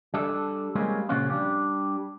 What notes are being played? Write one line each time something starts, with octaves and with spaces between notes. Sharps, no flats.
G3 D4 A4
G3 G#3 A#3 C4 C#4 F4
A#2 C#3 F3 C#4 F4 F#4
G3 D4 G4